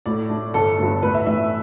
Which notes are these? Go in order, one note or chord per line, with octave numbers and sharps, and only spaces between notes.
A2 D5
A3 D4
G1 A4
G2 D3 B3 D4
A2 B4
E5
E3 A3 D4 E5